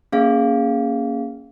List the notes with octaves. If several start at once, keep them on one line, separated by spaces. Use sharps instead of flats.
A#3 C#4 G#4 F5